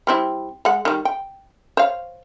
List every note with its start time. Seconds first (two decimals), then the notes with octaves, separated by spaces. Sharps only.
0.07 G3 C4 E4
0.65 G#3 F#5
0.85 D#3 G3
1.05 G5
1.77 C5 C#5 F5